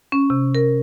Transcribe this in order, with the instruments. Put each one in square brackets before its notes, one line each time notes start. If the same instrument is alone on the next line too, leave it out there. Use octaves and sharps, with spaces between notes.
[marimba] C#4
C3
A#4